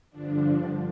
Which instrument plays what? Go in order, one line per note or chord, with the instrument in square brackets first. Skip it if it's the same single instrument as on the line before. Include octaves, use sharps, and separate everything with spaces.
[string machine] G2 D3 F3 D4